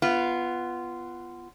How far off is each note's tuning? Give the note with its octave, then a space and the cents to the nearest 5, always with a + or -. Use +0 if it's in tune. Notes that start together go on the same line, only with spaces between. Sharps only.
B3 +0 F4 -15